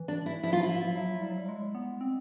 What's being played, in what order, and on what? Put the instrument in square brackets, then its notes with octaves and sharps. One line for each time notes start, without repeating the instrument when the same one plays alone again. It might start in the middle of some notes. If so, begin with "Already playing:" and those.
Already playing: [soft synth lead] E3
[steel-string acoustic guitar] D4
E4
[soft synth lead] F3 [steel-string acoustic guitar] E4
[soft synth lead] F#3 [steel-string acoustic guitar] F4
[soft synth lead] F3 [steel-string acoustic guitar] E4
[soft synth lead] F#3
G3
F#3
G3
G#3
B3
C4